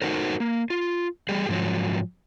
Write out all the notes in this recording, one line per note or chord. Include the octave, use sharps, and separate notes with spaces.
D#4 F#4 A4 A#4 C5
A#3
F4
G3 G4 G#4
G#2 F3 F#3